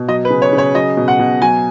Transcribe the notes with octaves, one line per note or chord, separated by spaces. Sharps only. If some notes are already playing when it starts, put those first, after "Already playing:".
Already playing: B2
F#3 D#5
B4
C#3
C#5
C#3
C#5
F#3 D#5
B2
F#5
B2
F#3 G#5